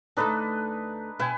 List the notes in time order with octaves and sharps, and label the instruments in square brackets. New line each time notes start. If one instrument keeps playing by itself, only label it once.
[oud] D2 A3 A4 [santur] D4 D#4 B4
[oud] B2 E4 [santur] B4 G5 G#5